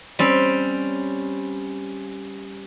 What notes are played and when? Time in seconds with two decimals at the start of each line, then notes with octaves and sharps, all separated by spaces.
0.19 G3 C4 C#4